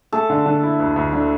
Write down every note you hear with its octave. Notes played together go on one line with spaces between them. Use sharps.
A3 A4
D3
D3
E4
D2
D2
D3